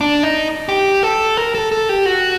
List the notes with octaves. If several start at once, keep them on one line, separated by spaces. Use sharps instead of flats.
D4
D#4
G4
A4
A#4
A4
A4
G4
F#4